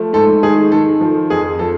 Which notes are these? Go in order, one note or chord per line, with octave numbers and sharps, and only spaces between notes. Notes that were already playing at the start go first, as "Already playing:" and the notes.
Already playing: F3 A3
G#2 A4
D#3 G#4
D#3 A4
F3
F2 G#4
F3 A4